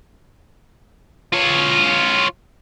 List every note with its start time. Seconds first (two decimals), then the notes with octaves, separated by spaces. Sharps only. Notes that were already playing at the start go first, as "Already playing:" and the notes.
1.33 F4 C#5